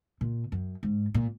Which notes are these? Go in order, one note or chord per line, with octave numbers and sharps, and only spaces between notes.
A#2
F#2
G#2
A#2